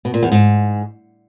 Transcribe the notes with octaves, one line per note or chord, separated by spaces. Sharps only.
B2
A#2
E2
G#2